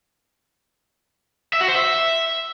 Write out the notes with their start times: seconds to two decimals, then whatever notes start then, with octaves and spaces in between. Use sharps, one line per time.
1.53 E5
1.61 F#4
1.68 C5
1.76 E5